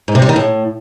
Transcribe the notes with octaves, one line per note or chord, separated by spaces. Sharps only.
G#2
C3
G3
D#3
A2